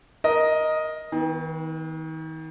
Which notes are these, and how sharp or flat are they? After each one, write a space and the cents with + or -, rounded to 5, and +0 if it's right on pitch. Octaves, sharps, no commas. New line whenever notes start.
A#4 +10 D#5 +0
D#3 +40 B3 +0